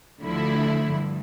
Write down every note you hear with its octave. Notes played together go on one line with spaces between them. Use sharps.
D2 D3 F3 A3 E4
G2